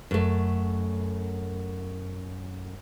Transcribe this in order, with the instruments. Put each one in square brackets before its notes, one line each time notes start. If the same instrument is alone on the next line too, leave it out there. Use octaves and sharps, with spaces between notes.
[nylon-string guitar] F#2 A3